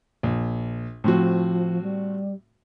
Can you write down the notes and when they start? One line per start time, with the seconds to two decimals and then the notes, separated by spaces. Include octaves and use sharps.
0.23 A#1
1.04 A2 F3 C4 F#4
1.82 G3